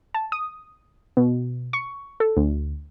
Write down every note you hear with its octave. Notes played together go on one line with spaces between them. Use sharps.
A5
D#6
B2
C#6
A4
D2